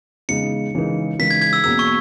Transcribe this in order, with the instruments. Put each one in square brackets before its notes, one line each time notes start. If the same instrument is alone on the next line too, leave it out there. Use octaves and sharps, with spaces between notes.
[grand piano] E2 C#3 G#3 D#4 [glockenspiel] C#7
[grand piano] C#3 E3 G#3 D#4 A#4
[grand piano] C#3 E3 G#3 D#4 A#4 [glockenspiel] B6
[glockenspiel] G#6
G#6
E6
[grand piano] E2 B2 A#3 C#4 G#4 [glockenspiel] E6
[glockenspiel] C#6